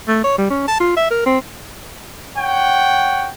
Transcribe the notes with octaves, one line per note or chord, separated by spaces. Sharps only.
A3
C#5
G3
C#4
A5
F4
E5
A#4
C4
C#5 F#5 G5